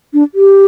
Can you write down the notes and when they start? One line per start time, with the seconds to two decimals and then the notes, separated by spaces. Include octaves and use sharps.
0.14 D4
0.35 G4